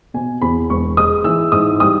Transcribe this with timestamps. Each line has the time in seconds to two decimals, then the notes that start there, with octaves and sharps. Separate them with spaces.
0.14 B2 G#5
0.42 E2 B5
0.70 E1 C#6
0.97 G#3 D#6
1.24 E3 E6
1.52 G#2 D#6
1.80 G3 D#6